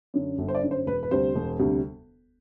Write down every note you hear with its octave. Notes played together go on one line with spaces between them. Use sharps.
F#2 D3
G1
C5
D5
F#2 D3
C5
E1 B4
B4
D2 C3 G3 C5
E1
D2 C3 G3